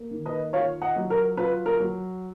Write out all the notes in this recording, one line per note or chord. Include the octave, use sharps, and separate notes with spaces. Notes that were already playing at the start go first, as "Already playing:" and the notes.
Already playing: A#3
D#3
B4 D#5
F4 C#5 F5
D#5 F#5
F#3
A#4
F4 B4
A#4
F#3